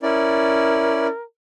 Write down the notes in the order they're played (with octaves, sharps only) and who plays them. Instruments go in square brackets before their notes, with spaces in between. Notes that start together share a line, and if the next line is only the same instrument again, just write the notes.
[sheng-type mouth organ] C#4 E4 D5 [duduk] A#4